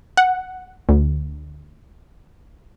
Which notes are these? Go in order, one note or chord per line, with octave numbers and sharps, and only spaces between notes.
F#5
D2